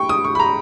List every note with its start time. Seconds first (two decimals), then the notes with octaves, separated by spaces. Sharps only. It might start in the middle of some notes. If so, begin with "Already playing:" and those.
Already playing: G5 C#6
0.09 D#6
0.24 C#6
0.35 B5
0.39 A#5